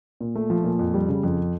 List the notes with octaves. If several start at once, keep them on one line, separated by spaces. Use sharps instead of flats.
A#2
A3
F3
A#2
F2
G3
C#3
F2